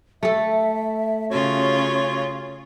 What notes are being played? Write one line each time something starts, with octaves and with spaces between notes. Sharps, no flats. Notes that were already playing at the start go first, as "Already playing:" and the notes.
A3 A4 E5
C#3 F4 F#4 C#5